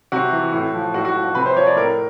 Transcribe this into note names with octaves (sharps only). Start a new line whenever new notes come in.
C3 F#4
E3
A2
F3
A2 F#4
F#4
F3
F#4
C3 B4
C5
F3 C#5
D5
A2 A#4